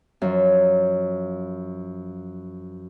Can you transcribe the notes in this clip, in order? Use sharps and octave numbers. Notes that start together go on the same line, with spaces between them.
F#2 F3